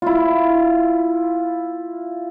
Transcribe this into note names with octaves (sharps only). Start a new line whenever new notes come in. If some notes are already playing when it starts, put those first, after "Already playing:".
E4 F4